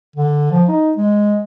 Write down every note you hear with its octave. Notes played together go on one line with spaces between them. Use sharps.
D3
F3
D#4
G#3